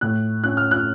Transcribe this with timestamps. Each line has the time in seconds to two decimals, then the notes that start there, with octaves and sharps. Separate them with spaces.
0.01 A2 F#6
0.44 C#4 F#6
0.57 F6
0.71 F#6